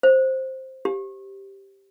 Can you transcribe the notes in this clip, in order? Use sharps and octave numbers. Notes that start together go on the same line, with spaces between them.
C5
G4